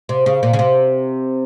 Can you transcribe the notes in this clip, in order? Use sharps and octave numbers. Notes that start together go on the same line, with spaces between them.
C3
C#3
A#2
C#3
C3